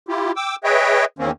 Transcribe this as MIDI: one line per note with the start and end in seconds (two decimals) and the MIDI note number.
0.08 0.32 64
0.08 0.32 65
0.08 0.32 67
0.36 0.56 79
0.36 0.56 86
0.36 0.56 88
0.64 1.05 68
0.64 1.05 71
0.64 1.05 73
0.64 1.05 75
0.64 1.05 76
0.64 1.05 79
1.19 1.31 40
1.19 1.31 51
1.19 1.31 58
1.19 1.31 60
1.19 1.31 61